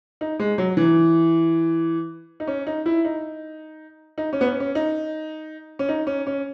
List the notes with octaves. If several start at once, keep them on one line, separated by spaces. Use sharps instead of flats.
D#4
G#3
F#3
E3
D#4
C#4
D#4
E4
D#4
D#4
C#4
B3
C#4
C#4
D#4
C#4
D#4
C#4
C#4